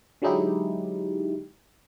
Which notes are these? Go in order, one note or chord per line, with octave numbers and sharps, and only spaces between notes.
D3 F#3 G#3 D#4 E4 G4